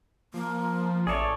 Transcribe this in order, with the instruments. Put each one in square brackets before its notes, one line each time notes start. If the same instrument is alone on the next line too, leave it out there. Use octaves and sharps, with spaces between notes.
[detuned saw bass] F3 [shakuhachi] A#3
[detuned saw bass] A1 [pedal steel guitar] G#4 A4 C#5 [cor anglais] D5 [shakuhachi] E5